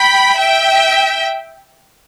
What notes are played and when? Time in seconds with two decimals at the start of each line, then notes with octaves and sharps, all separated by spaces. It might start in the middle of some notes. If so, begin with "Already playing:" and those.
Already playing: G5 B5
0.38 E5 G5